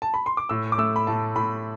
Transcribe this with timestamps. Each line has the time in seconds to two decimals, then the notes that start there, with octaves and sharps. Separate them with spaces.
0.02 A5
0.14 B5
0.26 C6
0.37 D6
0.49 A2 E6
0.72 D6
0.78 A3 E6
0.96 B5
1.07 A2 A5
1.36 A2 B5